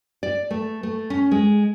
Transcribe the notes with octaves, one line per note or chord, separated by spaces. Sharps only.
D5
A3
A3
C#4
G#3